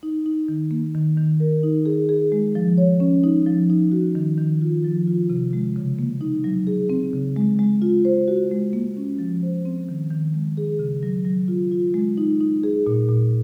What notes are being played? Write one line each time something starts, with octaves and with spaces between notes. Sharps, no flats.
D#4
D#4
D#3
A#3
D#3
D#3
A#4
D#4
G#4
G#4
G#3
F3
C#5
C#4
D#4
F3
D#4
F#4
D#3
D#3
F4
F3
F4
C3
G#3
C#3
A#3
D#4
F#3
G#4
C4
C#3
G#3
G#3
F4
C5
F#4
G#3
A#3
C#4
F3
C5
C4
D#3
D#3
G#3
G#4
C#3
F#3
F#3
F4
F4
G#3
D#4
D#4
G#4
A#2
A#2